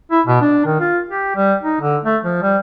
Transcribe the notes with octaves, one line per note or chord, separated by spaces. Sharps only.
E4
B2
D4
D#3
F4
G4
G3
D#4
D3
A3
F3
G3